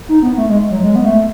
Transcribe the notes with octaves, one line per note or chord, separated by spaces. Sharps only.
D#4
B3
A3
G#3
F#3
G#3
B3
A3